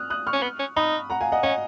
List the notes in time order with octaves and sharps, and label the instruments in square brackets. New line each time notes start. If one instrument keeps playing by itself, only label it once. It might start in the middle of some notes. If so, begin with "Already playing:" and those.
Already playing: [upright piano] D#6 F6 F#6
D#6 F#6
C#6 F6
[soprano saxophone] C#4
B3
C#4
[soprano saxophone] D#4 [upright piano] B5 D#6
[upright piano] F#5 A#5
F5 G#5
D#5 F#5
[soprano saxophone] C#4 [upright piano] D#5 F#5